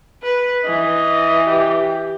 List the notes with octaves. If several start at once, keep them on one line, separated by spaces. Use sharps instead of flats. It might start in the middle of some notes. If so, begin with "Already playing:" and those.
B4
E3 D#5
G4
G4